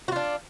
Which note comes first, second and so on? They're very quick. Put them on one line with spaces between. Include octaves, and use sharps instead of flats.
F#4 F4 D4